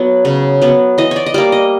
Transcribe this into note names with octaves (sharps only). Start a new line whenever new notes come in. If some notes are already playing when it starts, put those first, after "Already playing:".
Already playing: F#3 B3
C#3
F#3 B3
E3 D#5
C#5 D5
D#5
G3 A#3 D5
D#5